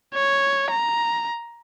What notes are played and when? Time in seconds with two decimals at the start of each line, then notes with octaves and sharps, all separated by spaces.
0.14 C#5
0.72 A#5